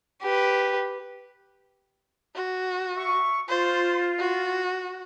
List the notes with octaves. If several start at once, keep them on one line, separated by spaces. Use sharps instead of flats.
G4 B4
F#4
E5 C#6
F4 C5
F#4